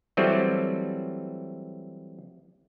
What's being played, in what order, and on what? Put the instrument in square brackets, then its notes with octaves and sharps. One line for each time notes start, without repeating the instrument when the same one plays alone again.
[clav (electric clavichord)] E3 F#3 G3 A3 C4